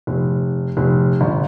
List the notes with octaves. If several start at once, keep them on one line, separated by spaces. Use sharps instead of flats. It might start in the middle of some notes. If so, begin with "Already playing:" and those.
F1
F1
G1